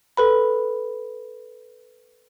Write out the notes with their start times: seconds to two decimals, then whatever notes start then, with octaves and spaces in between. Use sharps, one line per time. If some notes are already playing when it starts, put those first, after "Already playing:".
0.17 A4 B4 B5